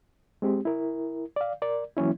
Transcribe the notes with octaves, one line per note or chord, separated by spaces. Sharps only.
G#3 C4 G4
E4 A#4
D5 F5
A#4 D5
E3 F#3 A#3 C#4 E4